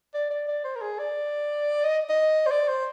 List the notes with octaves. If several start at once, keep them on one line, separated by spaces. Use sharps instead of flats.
D5
D5
D5
C5
A#4
G#4
D5
D#5
D#5
C5
D5
C5